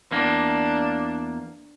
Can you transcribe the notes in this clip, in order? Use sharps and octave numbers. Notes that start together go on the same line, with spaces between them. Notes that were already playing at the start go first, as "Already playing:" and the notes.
E2 A#3 D4